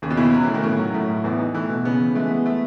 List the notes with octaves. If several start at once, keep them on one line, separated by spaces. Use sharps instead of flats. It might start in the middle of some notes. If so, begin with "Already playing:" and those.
D#2 C#3
B2
C#3 E4
F#3 E4
E3 A3
D#3
A2 C#3
F#3
A2 A3
A2
E2 E3
D#4
E3 A3
B2
C#3 B3
E3
G#3 A3
B3
A3